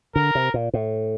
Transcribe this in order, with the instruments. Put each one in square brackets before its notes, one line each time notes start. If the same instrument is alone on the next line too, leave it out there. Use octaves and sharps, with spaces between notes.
[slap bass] D3 [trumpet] A#4
[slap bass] C3
A#2
A2